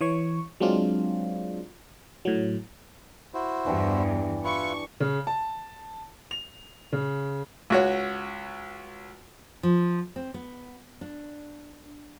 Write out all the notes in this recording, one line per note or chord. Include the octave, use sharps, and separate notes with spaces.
E3 C#5 C#6
F#3 G#3 C4 D4 F4
A2 F#3
E4 F#4 C5
E2 G2 E3 D4 G4
E4 F4 B4 C#6
C#3
A5
F7
C#3
C#2 F#4 C#5
F3
C4
B3
D4